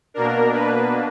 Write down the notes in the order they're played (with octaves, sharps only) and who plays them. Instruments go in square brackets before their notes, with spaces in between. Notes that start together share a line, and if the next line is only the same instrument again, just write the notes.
[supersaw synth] B2 A#3 D4 A#4
B4